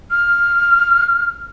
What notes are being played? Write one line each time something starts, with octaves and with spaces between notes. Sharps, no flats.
F6